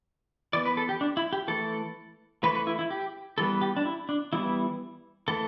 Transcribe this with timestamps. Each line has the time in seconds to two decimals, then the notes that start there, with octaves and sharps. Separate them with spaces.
0.53 E3 B3 D5
0.65 B4
0.77 A4
0.89 G4
1.01 D4
1.17 E4
1.33 G4
1.48 E3 A3 A4
2.43 E3 A3 B4
2.55 B4
2.67 E4
2.79 E4
2.91 G4
3.38 E3 G3 B3 A4
3.62 G4
3.77 D4
3.85 E4
4.09 D4
4.33 E3 G3 B3 E4
5.28 E3 A3 A4